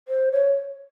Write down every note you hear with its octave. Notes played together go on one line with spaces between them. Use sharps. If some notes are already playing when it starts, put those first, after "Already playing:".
C5
C#5